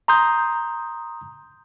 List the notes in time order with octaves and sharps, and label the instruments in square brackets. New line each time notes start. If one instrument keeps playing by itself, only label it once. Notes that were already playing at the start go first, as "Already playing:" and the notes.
[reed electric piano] A#5 C6 D#6 G6